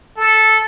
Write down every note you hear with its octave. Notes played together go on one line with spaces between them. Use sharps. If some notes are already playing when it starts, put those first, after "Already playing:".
A4